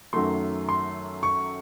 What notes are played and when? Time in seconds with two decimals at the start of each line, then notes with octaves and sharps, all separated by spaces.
0.13 F#2 D#3 F#3 A3 C6
0.69 C6
1.23 C#6